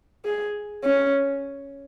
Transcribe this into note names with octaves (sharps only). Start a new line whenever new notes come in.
G#4
C#4